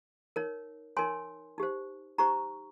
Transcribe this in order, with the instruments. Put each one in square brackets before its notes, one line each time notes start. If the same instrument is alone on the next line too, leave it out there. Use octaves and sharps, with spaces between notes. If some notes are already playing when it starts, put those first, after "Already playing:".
[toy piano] D#4 A#4 C#5
D#4 A#4 C#5 G#5 C6
D#4 G4 C5
D#4 G4 C5 A#5 C#6